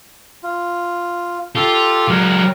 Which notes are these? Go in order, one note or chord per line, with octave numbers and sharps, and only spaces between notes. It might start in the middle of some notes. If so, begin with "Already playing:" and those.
F4
F4 G4 A4
F#3 G#3 A#4